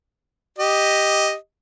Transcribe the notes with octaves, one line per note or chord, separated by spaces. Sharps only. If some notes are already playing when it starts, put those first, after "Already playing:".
G4 D#5